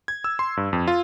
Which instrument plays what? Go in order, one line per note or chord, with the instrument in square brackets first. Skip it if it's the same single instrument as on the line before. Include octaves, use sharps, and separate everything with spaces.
[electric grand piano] G#6
E6
C6
G2
F2
F4